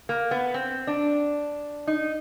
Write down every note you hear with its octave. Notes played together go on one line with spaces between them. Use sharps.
A#3
B3
C4
D4
D#4